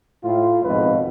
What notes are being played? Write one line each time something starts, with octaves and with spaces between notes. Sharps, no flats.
A2 F4
G#1 F2 G#2 B2 B4